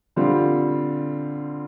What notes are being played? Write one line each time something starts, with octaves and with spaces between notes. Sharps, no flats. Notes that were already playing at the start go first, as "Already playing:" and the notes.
D3 G3 C4 F4